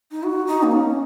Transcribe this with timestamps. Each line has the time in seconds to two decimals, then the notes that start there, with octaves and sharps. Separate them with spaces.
0.12 D#4
0.23 F#4
0.47 D#4
0.63 A#3
0.72 C#4